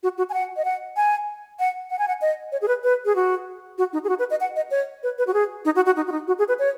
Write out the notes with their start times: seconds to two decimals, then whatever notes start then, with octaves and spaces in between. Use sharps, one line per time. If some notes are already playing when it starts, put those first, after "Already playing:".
0.03 F#4
0.18 F#4
0.30 G#5
0.34 F#5
0.57 D#5
0.65 F#5
0.97 G#5
1.59 F#5
1.90 F#5
1.99 G#5
2.08 F#5
2.22 D#5
2.52 C#5
2.62 G#4
2.68 B4
2.84 B4
3.05 G#4
3.16 F#4
3.78 F#4
3.93 D#4
4.04 G#4
4.09 F#4
4.19 B4
4.30 D#5
4.40 F#5
4.56 D#5
4.71 C#5
5.03 B4
5.18 B4
5.27 F#4
5.34 G#4
5.65 D#4
5.76 F#4
5.86 F#4
5.96 D#4
6.07 F#4
6.12 D#4
6.28 F#4
6.39 G#4
6.48 B4
6.59 C#5